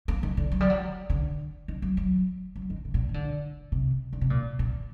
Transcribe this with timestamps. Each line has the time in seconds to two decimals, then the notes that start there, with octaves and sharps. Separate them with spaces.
0.08 A#3
0.23 D#3
0.37 D3
0.52 F#3
0.60 G3
0.70 F#3
1.10 D3
1.68 D#3
1.82 F#3
1.97 F#3
2.56 F#3
2.70 D#3
2.85 C3
2.94 A#2
3.09 D#3
3.14 D3
3.72 C3
4.13 D3
4.21 C3
4.30 A#2
4.59 A#2